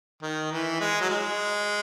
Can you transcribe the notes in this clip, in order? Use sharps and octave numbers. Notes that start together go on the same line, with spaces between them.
D#3
E3
G#3
F#3
G#3